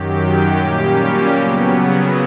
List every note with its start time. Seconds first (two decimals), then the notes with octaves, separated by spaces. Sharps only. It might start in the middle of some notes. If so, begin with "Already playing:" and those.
Already playing: F#2 D#3 F#3 G4
0.58 A#2 G3 A#3 C#4
1.36 C#3 F#3 B3